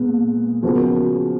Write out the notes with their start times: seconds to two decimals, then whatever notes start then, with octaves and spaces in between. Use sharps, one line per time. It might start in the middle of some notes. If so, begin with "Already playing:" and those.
Already playing: A#2 G#3 B3
0.63 C#3 F3 B3 F#4 A#4